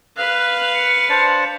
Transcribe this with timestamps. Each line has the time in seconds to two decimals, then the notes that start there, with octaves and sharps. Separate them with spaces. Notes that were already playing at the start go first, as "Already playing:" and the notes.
0.17 B4 F5 F#6
0.74 C#7
1.09 D4 C5 D5